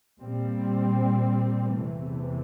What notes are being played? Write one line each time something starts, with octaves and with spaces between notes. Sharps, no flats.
A#2 G3 C4
E2 C3 E3 A3